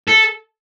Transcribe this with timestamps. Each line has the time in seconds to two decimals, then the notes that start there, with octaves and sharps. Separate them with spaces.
0.09 A4